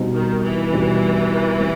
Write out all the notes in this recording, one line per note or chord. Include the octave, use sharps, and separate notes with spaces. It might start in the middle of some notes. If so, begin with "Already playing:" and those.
Already playing: B2 G3 C4 D#4
D#3
E3
B2 G3 C4 D#4
G3 C4